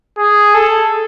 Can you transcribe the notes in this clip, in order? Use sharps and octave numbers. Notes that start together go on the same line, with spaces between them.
G#4
A4